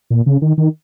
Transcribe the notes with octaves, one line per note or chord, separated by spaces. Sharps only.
A#2
C#3
D#3
D#3